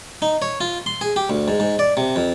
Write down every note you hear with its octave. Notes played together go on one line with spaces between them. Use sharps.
D#4
C#5
F4
C6
G#4
G4
D2
G#2
G#2
D5
C3
F2